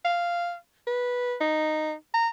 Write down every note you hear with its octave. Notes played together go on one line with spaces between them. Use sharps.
F5
B4
D#4
A#5